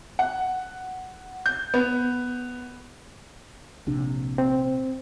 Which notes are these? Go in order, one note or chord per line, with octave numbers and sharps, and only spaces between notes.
F#5
G6
B3
A#1 C3 D4
C4